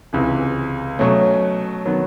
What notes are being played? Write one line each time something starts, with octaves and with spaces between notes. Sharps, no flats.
C#2 C3 E3 G#3
B2 F#3 A3 C#4
D#3 F#3 B3